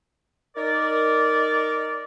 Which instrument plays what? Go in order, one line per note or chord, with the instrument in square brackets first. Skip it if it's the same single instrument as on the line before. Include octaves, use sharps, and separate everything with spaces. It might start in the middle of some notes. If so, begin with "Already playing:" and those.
[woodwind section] D#4 A#4 D5